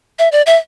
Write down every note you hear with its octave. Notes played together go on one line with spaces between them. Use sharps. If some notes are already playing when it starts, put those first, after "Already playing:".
E5
D5
E5